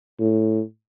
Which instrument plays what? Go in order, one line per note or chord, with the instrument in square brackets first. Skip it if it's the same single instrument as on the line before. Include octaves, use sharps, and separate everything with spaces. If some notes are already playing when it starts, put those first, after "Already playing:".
[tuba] A2